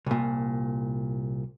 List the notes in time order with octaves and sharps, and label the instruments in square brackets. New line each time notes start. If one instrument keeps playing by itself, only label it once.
[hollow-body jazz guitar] C2 A#2